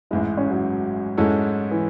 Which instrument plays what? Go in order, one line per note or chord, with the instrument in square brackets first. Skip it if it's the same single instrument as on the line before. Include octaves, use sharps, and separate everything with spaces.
[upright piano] A1 G#2 G#3 [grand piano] E4
[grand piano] C#4
F#3
[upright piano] G#2 G#3 C#4 E4 A4
[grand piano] E3